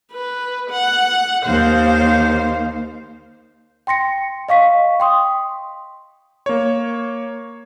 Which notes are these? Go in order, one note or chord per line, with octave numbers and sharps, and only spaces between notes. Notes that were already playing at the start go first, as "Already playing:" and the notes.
B4
F#5
D#2 C5 F5
G5 C6 A#6 C#7
D#5 F5 C#6 B6
G5 C6 D#6
A#3 C#5